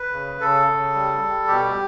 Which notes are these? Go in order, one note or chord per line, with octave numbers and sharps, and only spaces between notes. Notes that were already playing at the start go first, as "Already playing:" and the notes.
Already playing: B4
C#3
C#3 A4
C#3
G3
G3
B2 G4